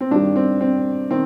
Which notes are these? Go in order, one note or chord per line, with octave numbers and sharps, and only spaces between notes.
C4
G2 D#3 G3 D4
C4
C4
D#3 C4